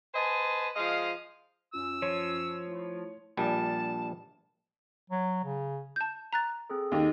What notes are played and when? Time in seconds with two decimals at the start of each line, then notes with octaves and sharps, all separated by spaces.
0.14 B4 C5 D#5 G#5 A5
0.76 F3 G#3 D#5 F5
1.74 F#2 C#4 F4 E6
2.02 F3 C#5
2.67 A3 E4
3.37 A#1 A#2 G3 A5
5.10 F#3
5.44 C#3
5.96 A5 G6
6.33 A#5 F#6 A6
6.70 C4 G#4 A4
6.92 D#2 D#3 G4 A4 D#5